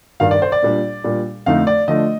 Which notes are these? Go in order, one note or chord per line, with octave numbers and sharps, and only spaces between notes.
G2 D#3 G3 F5
D5
C5
D5
A#2 G3 D4
A#2 G3 D4
F2 D3 F3 A3 D#4 F5
D5
D3 F3 A3 D4 D#5